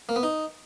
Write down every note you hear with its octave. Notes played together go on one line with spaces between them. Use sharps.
A#3
B3
D#4